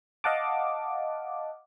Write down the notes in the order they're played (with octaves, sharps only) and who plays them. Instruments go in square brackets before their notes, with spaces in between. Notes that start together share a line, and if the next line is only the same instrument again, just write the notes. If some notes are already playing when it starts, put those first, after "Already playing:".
[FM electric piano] D#5 F5 F#5 A5 D6